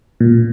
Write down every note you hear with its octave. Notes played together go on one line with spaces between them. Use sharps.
A#2